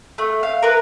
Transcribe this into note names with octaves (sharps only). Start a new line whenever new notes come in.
A3
F5
A#4 B4